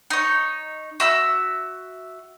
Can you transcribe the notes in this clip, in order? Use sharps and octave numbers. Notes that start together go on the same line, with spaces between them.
D#4 C#5
F#4 E5 E6